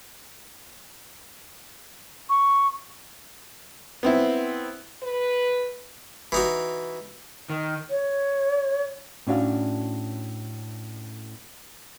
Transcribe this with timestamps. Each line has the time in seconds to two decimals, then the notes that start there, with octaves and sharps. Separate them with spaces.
2.29 C#6
4.03 B3 C4 E4
5.03 B4
6.32 E3 D#4 F#4
7.50 D#3
7.89 C#5
9.27 A2 C#4 D4 F#4 F5